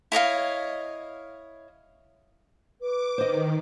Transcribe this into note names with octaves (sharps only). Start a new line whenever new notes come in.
E4 C#5 D#5 F5
B4 D6
D#3 C5 D#5